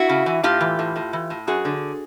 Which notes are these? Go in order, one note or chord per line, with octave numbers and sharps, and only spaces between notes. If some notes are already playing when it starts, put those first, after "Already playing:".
Already playing: E4 F#4
C#3
E3
A2 F4 G4
E3
A2
A2
E3
A2
F#2 F#4 G#4
D3